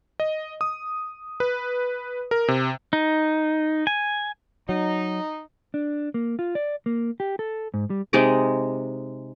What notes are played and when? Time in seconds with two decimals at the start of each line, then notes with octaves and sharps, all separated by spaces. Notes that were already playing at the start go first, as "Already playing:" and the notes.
0.20 D#5
0.61 D#6
1.40 B4
2.31 A#4
2.48 C3
2.93 D#4
3.87 G#5
4.69 F#3 D#4
5.74 D4
6.14 A#3
6.39 F4
6.55 D5
6.86 A#3
7.20 G4
7.39 A4
7.74 G#2
7.90 G3
8.13 C3 G#3 D#4 D5